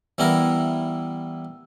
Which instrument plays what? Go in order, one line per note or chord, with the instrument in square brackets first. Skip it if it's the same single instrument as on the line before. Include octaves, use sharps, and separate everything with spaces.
[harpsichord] E3 G3 B3 E4 A#4